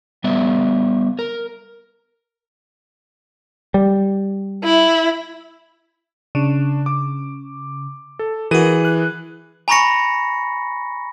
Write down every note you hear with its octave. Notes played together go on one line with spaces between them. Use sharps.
G3 B3 D5 E5
A#4
G3
E4
C#3 D4
D6
A4
E3 F#4 G#4 A#4 D#7
F#6
G#5 A#5 B5 C#6 A#6 C#7